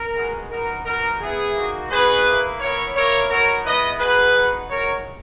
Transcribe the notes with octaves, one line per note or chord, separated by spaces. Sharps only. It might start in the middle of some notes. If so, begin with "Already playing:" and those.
Already playing: A#4
G#3 B3 D#4 F#4
B3 D#4 F#4 A#4
B3 D#4 F#4 A#4
B3 E4 G#4
A#3 D#4 F#4
G#3 B3 D#4 F#4 G#4 B4
A#3 E4
B3 E4 A#4 C#5
A#3 E4 A#4 C#5
B3 D#4 F#4 A#4 C#5
G#3 B3 E4 B4 D#5
B3 D#4 F#4 G#4 B4
B3 D#4 F#4
G#3 D#4 F#4 A#4 C#5